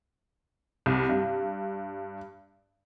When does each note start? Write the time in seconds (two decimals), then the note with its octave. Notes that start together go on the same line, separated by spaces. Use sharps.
0.86 C2
1.09 G2